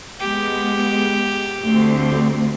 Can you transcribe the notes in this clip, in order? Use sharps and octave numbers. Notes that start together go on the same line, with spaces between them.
G#3 B3 G4
D2 C4